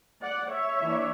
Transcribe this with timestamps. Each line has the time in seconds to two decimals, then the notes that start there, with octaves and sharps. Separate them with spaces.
0.21 D5 F#5
0.52 C#5 E5
0.82 E3 A#3 D4